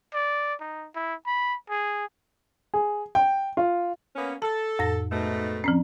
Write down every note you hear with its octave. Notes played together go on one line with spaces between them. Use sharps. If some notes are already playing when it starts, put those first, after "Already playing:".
D5
D#4
E4
B5
G#4
G#4
G5
F4
A#3 B3 C#4
A4 A5
F2 A2 A#6
G#2 B2 A3
F3 C4 C#4